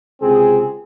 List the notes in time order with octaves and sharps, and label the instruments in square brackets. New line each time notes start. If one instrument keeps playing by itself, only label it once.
[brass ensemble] C#2 C3 C4 G#4